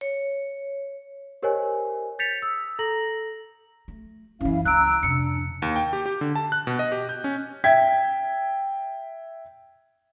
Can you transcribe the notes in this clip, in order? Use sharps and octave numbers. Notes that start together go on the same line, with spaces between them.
C#5
G4 A#4 C5 C#5 D#5 G#5
G6 A6 B6 C#7 F7
D#6 E6
A4 A#5 A#6 F#7
A3
F#2 E3 C#4 E4 F5
C#2 A#5 E6 F#6 D7
F2 C3 D4 C#7
D#2
G5
G4
G4
D3
A5
F#6
B2
D#5
G4
G6
C#4
E5 G5 G#6 B6